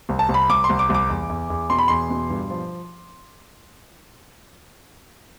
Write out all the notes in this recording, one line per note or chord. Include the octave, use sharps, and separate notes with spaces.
C2
A5
C2
B5
C2 D6
C6
C2
D6
C2 D6
E2
E2
E2
B2 C6
B5
E2 C6
B2
G2
F3